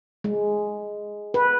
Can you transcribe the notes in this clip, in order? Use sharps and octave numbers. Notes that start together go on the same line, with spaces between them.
G#3
B4